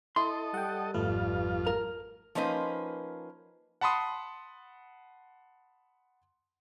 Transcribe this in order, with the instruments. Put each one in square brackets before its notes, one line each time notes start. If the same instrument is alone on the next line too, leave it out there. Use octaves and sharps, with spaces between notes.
[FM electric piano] E4 [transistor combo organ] A4 D#5 [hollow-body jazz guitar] C6
[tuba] G3 [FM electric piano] F#5 G5
[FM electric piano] G#1 A3 B4 [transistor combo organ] F2 F4
[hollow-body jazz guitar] A#4
[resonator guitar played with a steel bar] F3 A#3 C#4 D#4 B4 C5
[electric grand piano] F#5 A5 B5 C6 D#6